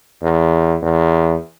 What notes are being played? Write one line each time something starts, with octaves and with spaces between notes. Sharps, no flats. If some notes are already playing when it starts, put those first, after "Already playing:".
E2
E2